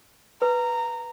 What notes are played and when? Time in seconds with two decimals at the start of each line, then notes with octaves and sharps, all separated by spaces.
0.42 B4 A#5